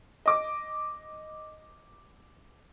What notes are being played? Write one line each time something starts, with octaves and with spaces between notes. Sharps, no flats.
D#5 D6